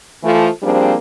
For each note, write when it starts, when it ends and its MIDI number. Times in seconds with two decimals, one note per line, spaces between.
0.23 0.48 52
0.23 0.48 53
0.23 0.48 57
0.63 0.95 53
0.63 0.95 55
0.63 0.95 58
0.63 0.95 60
0.63 0.95 62
0.63 0.95 68